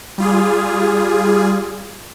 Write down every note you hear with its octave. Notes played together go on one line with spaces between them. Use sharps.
G3 F4 G#4